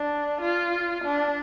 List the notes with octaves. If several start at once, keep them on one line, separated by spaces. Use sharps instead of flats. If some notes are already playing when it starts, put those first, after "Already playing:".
Already playing: D4
F4
D4